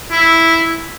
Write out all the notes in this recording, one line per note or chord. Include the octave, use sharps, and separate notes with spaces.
E4